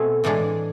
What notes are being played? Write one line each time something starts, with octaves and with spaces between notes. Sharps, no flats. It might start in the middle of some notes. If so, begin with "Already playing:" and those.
Already playing: B2 A3 C4 G#4
A2 E3 G#3 D4 G#4